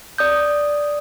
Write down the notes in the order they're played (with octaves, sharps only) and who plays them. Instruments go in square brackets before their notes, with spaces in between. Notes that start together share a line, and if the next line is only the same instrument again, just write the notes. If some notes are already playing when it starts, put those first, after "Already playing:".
[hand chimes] D5 D#6 G6